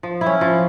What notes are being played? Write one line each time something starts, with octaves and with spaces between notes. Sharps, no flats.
F3
E4
C#4
F3